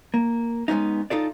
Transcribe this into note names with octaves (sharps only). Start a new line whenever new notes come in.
A#3
G#3 A3 B3 C#4 D#4
D#4 F4 A4 D5